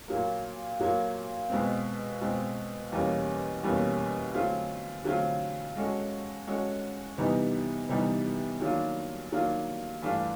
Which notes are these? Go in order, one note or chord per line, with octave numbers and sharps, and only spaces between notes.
A#2 F#3 A#3
A#2 F#3 A#3
B2 G#3 C4
B2 G#3 C4
E2 B2 G3 A#3 C#4
E2 B2 G3 A#3 C#4
D3 F#3 A3 C4 F4
D3 F#3 A3 C4 F4
G#3 C#4 F#4 A4
G#3 C#4 F#4 A4
C3 E3 G3 B3 D#4
C3 E3 G3 B3 D#4
D#3 F#3 A#3 D4 F4
D#3 F#3 A#3 D4 F4
G2 E3 A3 D4 F4